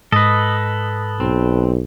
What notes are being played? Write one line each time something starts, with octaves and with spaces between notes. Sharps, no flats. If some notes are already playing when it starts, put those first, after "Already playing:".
G#2 A4 B4 D#5
B1 C4